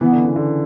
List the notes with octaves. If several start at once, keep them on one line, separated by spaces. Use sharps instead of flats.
E3 B3
D3
C#3
D3